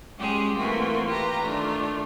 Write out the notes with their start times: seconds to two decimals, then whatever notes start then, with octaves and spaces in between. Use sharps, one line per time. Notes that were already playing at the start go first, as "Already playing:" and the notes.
0.18 G3 G#3 C#4 F4 G4 G#4
0.57 E3 A3 A#3 C4 F4 F#4
1.07 F4 G4 B4 A#5
1.42 D#3 A3 D4 F4